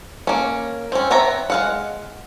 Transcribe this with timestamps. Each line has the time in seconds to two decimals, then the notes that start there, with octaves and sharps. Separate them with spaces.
0.27 A#3 C#4
0.92 C4 C#4
1.10 B3 C4 C#5 E5 A#5
1.50 G#3 F5 F#5